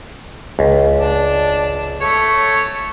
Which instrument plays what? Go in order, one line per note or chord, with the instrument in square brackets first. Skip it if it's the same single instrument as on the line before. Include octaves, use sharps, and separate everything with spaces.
[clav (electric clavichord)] C#2
[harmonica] D4
A3 C#5